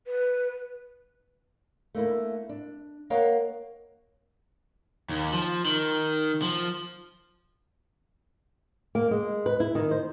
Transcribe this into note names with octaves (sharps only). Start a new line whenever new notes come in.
B4
A3 A#3 D4 E4
D4
A#3 A#4 C#5 D#5 F5 F#5
D#2
F3
D#3
F3
A#3
G#3
B4
E4
D#3
C5